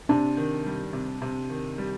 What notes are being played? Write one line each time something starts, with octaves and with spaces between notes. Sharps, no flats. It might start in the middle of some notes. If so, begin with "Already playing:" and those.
C3 D4
D#3
G3
C3
C3
D#3
G3